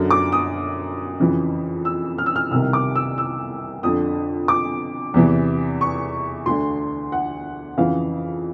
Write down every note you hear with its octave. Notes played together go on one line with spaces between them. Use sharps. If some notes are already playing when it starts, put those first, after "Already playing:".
Already playing: F#2 D3
D6
D#6
F2 C#3 E3
E6
F6
E6
F6
C2 C3 D#3 E6
D6
E6
E6
F2 D3 D#6
D6
E2 C3 E3
C#6
D2 D3 C6
F#5
F2 C#3 E3 F5